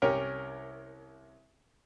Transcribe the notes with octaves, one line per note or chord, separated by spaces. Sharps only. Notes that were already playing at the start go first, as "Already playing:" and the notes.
C2 C#4 G4 A#4 C#5